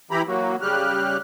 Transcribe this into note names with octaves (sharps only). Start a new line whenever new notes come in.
E3 E4 G4 A#5 B5
F#3 A#3 F#4
C#3 G3 G4 F6 F#6